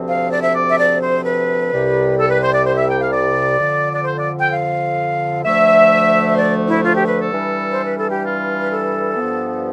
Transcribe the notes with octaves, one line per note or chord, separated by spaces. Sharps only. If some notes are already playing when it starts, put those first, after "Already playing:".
Already playing: D2 C3 F3 C4
F5
D5
E5
D5
E5
D5
C5
B4
C2 C3 G3
A4
B4
C5
D5
C5
E5
G5
F5
D5
F2 D3 F3
D5
C5
D5
G5
F5
D2 D3 F3 A3 E5
C5
D5
E4
F4
G4
B4
A4
G2 E3 G3 D4
C5
B4
A4
G4
F4
B4
A4
G2 F3 B3